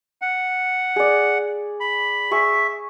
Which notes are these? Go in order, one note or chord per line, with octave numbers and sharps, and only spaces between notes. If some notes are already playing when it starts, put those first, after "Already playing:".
F#5
G#4 D5
B5
G#4 E5 C#6